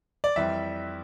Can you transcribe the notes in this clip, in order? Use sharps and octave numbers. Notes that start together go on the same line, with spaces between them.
D5
F2 E3 G3 C4 E5